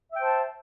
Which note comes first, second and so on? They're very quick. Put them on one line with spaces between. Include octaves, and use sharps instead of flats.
E5 G5 C5 A5